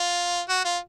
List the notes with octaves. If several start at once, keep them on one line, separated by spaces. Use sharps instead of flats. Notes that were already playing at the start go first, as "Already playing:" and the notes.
Already playing: F4
F#4
F4